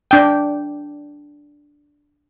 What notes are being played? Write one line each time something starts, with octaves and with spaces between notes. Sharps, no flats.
D4 G5